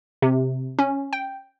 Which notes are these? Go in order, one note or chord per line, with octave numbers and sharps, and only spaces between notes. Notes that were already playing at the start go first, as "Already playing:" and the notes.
C3
C#4
G5